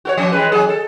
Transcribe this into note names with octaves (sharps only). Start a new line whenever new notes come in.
F#4 A#4 C#5
F3 C#4
E3 G#3 B4
D#3 F#3 G#4
A4